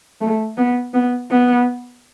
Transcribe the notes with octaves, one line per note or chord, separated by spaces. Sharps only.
A3
B3
B3
B3